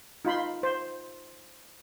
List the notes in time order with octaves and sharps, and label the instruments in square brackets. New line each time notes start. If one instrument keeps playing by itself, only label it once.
[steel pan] D#4 F4 B5 C6
C5